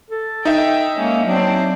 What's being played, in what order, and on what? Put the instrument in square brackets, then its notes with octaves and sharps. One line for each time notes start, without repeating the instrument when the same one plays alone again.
[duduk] A4
[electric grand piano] D#4 E5 [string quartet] G5
[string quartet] G#3 C#4 [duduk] A#3
[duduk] F#3 [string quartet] C4 D4